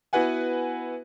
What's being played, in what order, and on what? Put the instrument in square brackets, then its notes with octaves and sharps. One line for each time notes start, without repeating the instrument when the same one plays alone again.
[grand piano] B3 E4 F#4 B4 F#5 G#5